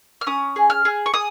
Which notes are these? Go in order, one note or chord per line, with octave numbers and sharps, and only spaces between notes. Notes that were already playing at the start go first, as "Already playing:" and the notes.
F6
C#4 D#6
G#4
F6
G#4
C#6
G#4 D#6